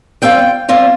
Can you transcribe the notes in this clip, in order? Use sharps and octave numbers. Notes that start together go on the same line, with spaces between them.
G3 C4 F4 G5
G3 C4 F4